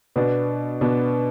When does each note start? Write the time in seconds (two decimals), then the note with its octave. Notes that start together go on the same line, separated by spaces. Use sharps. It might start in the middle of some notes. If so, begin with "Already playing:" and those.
0.16 B2 B3 D4
0.81 B2 B3 D4